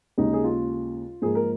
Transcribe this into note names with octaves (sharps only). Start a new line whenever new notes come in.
D#2 C#3 G#3 D#4
G#4
F4
G#2 F3 A#3 G#4
A#4